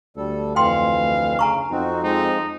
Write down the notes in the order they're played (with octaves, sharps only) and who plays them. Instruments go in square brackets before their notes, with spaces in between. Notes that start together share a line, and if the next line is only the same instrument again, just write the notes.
[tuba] D2 [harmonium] G3 A4
[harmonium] F2 E3 [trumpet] F5 [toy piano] G5 C6
[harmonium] C#3 [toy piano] G#5 A#5 C#6
[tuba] F2 [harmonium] C4 D#4 F#4
[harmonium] F3 G#3 C4 [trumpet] D#4